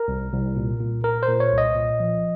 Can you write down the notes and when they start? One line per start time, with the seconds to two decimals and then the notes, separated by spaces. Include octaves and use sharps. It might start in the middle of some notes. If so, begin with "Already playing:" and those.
Already playing: A#4
0.08 C2
0.33 C2
0.56 A#2
0.80 A#2
1.04 A#2 A#4
1.23 C5
1.29 A#2
1.40 C#5
1.52 C2
1.58 D#5
1.76 A#2
2.00 F3